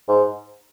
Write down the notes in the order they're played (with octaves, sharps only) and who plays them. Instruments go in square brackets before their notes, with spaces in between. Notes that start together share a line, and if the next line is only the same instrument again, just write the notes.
[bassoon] G#2